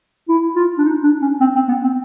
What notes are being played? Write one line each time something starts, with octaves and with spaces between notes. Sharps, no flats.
E4
F4
D4
D#4
D4
C#4
C4
C4
B3
C4